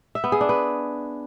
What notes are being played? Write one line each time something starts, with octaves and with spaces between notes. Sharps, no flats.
E5
B3
G#4
D4
B4